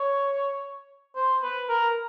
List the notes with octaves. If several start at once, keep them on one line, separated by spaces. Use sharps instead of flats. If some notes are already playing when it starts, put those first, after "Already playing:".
Already playing: C#5
C5
B4
A#4